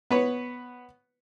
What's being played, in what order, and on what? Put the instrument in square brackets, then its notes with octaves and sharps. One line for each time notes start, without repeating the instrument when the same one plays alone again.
[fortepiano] B3 B4 C#5